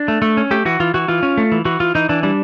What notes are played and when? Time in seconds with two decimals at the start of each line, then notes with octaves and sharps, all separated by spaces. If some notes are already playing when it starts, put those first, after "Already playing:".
Already playing: D4
0.08 A3
0.22 A3
0.37 C#4
0.51 A3 G4
0.65 E3 F#4
0.80 E3 F4
0.94 E3 F#4
1.08 E3 F4
1.23 C#4
1.38 A3
1.52 E3
1.65 E3 F#4
1.80 E3 F4
1.95 E3 D#4
2.09 E3 D4
2.23 G3 D4